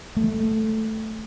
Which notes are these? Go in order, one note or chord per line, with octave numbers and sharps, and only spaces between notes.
A3